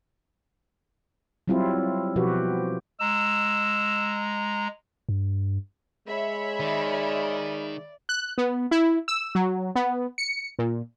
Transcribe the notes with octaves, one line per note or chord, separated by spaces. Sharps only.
F#3 G3 C4 E4 F4
B2 F3 F#4 G4 B4
G#3 A#5 E6
G2
G#3 C#5 E5 B5
D#3 D5
F#6
B3
E4
E6
F#3
B3
C#7
A#2